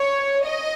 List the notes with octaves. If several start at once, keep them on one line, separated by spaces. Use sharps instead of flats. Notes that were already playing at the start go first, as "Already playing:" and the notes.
Already playing: C#5
D#5